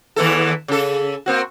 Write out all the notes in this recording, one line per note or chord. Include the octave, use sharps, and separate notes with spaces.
D#2 E3 A4
C#3 A4
A#3 C4 F#4